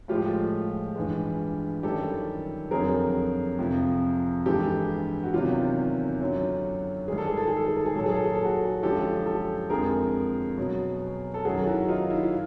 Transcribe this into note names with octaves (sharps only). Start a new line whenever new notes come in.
A2 F3 G#3 F4 G4
G2 E3 G#3
F#2 D#3 G3 G4 A4
F2 D3 F#3 G#4 A#4
F2 C3 F3
G2 E3 G#3 G4 A4
F#4
E2 C3 D#3 F#3 F4 G4
F#2 D3 F#3
G#2 D#3 G3 G#4
A4
G#4
A4
G#4
A4
G#4
A4
G#4
A#2 F#3 A4
G#4
A4
G#4
A4
F#4 G#4
F#2 D3 F3 G#3 G4 A4
G4 A4
F2 D3 F3 G#3 G#4 A#4
B2 F#3
A4
F#2 D#3 F#3 F#4 G#4
E4 F#4
D#4 F4
E4
F4